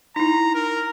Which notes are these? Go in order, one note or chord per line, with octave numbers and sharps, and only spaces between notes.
D#4 E4 A#5
A#4